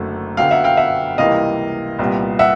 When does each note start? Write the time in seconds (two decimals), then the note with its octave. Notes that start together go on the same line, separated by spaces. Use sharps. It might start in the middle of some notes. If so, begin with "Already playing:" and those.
Already playing: F#1 F#2 D3 F#3 A3
0.37 F#2 D3 F#3 B3 F5 G5
0.51 E5 F#5
0.64 F5 G5
0.77 E5 F#5
1.18 C#2 C3 E3 G3 A#3 D#5 F5
1.99 C2 A#2 G3 B3
2.39 E5 F#5